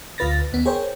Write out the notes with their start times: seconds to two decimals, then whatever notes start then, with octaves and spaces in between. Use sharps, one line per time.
0.18 D2 F4 B4 A6 A#6
0.52 D#2 B3
0.66 G#4 A#4 C5 C#5 G5